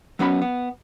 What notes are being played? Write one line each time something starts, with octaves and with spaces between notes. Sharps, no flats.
F#3 B3 C#4 G5 B5
B3